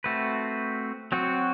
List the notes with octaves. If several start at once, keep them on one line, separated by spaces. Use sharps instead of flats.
A3 C4 F#4 B4
F#3 C4 F#4